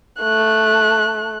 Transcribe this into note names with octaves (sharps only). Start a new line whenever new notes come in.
A3 F#6